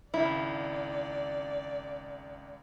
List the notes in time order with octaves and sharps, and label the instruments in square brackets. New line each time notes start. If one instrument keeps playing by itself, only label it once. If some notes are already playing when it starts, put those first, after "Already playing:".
[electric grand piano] G#1 C#2 [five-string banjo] E4 [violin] D5